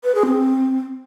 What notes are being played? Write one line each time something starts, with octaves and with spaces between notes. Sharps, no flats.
B4
G#4
C4